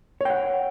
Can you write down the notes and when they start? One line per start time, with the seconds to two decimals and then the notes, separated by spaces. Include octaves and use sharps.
0.21 C#5
0.25 G5
0.30 F#5